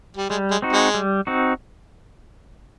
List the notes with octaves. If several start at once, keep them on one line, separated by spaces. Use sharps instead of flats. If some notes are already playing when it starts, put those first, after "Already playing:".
G3
G3 G#3
G#3
C4 D#4 F#4
G#3
G3
C4 D#4 F#4